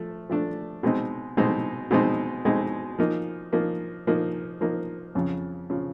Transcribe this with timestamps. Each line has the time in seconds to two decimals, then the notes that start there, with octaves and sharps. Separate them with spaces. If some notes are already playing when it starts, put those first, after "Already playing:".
Already playing: F3 A3
0.29 F3 A3 D4
0.83 B2 G#3 C4 D#4
1.37 B2 G#3 C4 D#4
1.91 B2 G#3 C4 D#4
2.45 B2 G#3 C4 D#4
2.99 F3 A#3 D#4
3.53 F3 A#3 D#4
4.07 F3 A#3 D#4
4.61 F3 A#3 D#4
5.15 F2 C#3 F3
5.70 C#3 F3